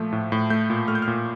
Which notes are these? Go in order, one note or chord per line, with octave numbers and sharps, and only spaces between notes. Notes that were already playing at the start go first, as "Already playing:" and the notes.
Already playing: A#2 F3 A3
A2
A2
A3 G6
A#2
A3 F6
G6
F6
A#2